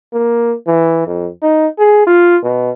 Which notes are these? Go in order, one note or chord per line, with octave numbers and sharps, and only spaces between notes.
A#3
E3
F2
D#4
G#4
F4
B2